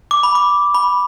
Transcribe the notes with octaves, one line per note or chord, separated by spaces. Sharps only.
D6
B5
D6
B5